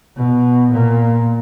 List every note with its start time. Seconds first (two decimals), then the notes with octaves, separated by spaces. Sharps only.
0.17 B2
0.71 A#2